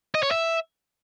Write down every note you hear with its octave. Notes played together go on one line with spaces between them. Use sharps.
D#5
C#5
E5